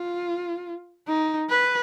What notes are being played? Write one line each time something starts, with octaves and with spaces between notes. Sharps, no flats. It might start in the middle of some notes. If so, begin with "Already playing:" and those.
Already playing: F4
D#4
B4